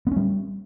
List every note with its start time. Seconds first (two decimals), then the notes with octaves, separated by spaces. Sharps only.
0.07 B3
0.12 C#4
0.16 G3